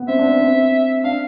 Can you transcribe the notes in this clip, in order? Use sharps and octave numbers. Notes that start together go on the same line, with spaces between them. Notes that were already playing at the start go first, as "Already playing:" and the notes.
Already playing: B3
C4 E5
D4
C4
C4
D4 F5